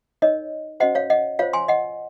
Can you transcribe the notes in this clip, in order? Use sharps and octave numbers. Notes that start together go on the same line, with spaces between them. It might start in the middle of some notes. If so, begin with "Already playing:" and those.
D#4 A#4 C#5 D#5
C#4 F#4 C5 D#5 F#5
C#5 F5
D#5 F#5
F4 C5 C#5 F5
G#5 C6
D#5 F#5